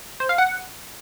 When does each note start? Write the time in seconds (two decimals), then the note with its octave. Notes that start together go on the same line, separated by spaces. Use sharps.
0.20 C5
0.29 F5
0.38 F#5